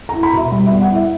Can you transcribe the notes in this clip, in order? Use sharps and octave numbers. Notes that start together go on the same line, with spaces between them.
A#5
E4
B5
B2 E5
G3
E5
B3
F#5
E4 E5